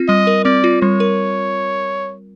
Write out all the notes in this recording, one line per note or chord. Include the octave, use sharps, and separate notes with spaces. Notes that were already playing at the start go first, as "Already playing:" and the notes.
Already playing: C4 F4
G3 D#5
A#4
C4 D5
F4
G3 C#5
A#4